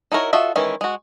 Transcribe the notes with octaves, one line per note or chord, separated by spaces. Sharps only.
D#4 E4 F#4 A#4 C#5
F4 F#4 A4 D#5 E5
D#3 E3 G#3 C#4 E4
G#3 F#4